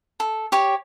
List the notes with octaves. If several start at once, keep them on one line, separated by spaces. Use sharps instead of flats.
A4
G4 C#5